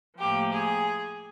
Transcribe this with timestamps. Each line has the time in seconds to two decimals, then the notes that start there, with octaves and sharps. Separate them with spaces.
0.19 A2 F3 A#3 G4
0.52 G#4